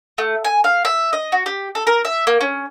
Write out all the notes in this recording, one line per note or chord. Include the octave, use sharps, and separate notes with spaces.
A3
G#5
F5
E5
D#5
F#4
G4
A4
A#4
E5
A#3
C#4